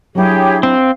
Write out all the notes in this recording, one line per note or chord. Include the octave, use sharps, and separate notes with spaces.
F#3 D4 E4 G4 G#4 C#5
C4 F5